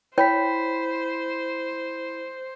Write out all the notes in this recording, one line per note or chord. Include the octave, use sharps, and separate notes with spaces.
E4 C5 C#5 G5 B5 B6